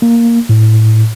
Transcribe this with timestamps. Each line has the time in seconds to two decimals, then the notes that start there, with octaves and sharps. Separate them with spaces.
0.02 A#3
0.49 A2